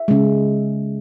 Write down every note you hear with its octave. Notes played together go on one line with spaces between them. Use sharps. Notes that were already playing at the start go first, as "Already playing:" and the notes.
Already playing: E5
C#3 G#3